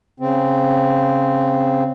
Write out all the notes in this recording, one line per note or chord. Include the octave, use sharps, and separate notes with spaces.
C#3 C4